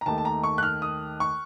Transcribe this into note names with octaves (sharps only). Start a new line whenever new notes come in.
A#5
D#2 D#3 A3 A5
A5
A#5
C#6
F#6
F6
D#6
C#6